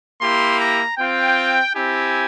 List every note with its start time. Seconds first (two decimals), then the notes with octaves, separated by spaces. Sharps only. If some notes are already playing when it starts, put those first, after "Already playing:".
0.21 A#3 E4 G4 C6
0.59 A#5
0.97 C4 F4 G5
1.74 C4 E4 G4 G#5